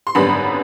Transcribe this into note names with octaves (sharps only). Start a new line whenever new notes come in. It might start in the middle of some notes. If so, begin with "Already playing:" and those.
C6
G#1 F#2 D3 G3 B3 B5